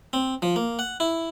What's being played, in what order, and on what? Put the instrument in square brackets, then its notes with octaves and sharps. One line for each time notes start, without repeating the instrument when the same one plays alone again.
[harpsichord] C4
F3
A#3
F#5
E4